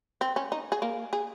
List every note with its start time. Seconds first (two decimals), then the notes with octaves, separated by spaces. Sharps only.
0.21 C4
0.36 C#4
0.52 D#4
0.72 G#4
0.82 A#3
1.13 G#4